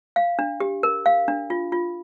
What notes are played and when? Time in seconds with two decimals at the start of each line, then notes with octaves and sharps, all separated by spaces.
0.16 F5
0.39 D4
0.60 G4
0.83 A#4
1.06 F5
1.28 D4
1.50 F4
1.72 F4